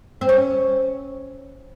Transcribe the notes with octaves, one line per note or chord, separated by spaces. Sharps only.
C4
C#4